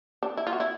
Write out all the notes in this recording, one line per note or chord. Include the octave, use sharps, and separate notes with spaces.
D4
E4
F4
F#4
E4